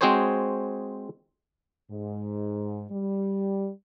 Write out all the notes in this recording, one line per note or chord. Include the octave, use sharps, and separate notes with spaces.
G#3 C4 F#4 G#4 C5 C#5
G#2
G3